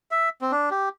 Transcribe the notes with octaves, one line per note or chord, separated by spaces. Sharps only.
E5
C4
D4
G4